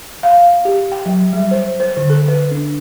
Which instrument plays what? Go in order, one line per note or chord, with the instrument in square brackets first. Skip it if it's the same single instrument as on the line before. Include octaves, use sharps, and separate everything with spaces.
[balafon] F5
G4
G5
F#3
G3
C5
C5
D3
A4
B4
D4